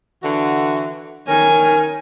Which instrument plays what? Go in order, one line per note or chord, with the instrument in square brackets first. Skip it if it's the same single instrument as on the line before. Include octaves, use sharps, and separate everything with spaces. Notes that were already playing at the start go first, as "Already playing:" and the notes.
[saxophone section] D3 E3 F#4
[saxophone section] D#3 C#4 A#4 [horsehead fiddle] G#5